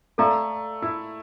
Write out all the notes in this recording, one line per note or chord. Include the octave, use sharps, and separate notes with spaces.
A3 A4 D5 F5 A#5
E4